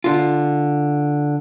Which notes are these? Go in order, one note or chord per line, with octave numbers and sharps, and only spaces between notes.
D3 F4